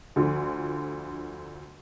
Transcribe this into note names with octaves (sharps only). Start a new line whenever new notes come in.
D2 D3 F3